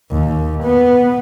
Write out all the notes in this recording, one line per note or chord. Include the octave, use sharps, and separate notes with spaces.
D#2
B3